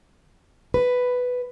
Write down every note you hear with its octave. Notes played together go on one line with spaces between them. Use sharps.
B4